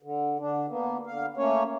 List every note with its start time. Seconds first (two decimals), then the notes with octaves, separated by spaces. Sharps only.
0.03 D3
0.39 D3 D4
0.68 A#3 B3
1.07 D3 F5
1.37 A3 A#3 C#4 C#5